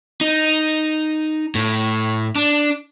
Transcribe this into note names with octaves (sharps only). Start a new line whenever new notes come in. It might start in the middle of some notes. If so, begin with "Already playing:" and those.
D#4
A2
D4